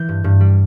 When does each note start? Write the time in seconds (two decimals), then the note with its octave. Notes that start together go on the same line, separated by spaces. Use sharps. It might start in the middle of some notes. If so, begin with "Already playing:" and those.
Already playing: E3 G6
0.09 G2
0.24 G2
0.41 G3